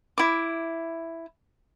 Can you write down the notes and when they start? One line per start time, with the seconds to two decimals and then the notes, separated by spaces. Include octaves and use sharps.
0.18 E4 D6